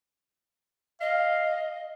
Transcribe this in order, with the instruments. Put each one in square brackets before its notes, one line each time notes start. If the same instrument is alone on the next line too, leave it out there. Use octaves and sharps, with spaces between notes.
[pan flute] D#5 [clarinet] F5